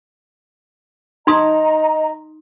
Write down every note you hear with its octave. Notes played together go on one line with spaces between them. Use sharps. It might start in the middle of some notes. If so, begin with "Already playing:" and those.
D#4 D#5 A#5 C6 D#6